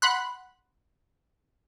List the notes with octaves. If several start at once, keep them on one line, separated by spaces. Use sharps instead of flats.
F#5 B5 C6 F#6